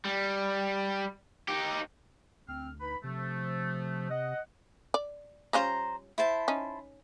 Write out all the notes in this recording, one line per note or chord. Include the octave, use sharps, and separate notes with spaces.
G3
D#4 G4
D2 C4 F6
D#4 B4 B5
C3 F3 A3
D#5 F#5
D5
G3 C#4 F4 C5 A#5
E4 C5 A5
C#4 D#4